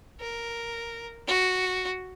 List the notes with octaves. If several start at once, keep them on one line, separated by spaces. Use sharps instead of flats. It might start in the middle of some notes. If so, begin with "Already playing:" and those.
A#4
F#4